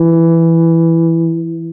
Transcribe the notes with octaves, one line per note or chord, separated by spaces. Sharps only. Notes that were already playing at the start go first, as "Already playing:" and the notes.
Already playing: E3